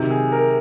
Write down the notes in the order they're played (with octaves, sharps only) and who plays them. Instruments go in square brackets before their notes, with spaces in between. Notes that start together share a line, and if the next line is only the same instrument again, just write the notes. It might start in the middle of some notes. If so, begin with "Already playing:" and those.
Already playing: [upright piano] C3 D#3 F#3
[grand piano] G#4
A#4